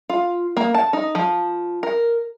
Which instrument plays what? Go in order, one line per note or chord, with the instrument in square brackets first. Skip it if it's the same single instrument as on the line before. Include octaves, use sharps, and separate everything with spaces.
[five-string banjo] F4
A#3
A5
D#4
F3
A#4